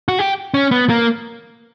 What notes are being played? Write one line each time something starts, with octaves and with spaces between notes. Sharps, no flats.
F#4
G4
C#4
B3
A#3